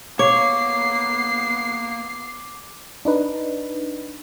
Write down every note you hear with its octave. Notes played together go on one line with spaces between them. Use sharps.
A#3 B3 C#5 F5 D6 C7
D4 D#4 B4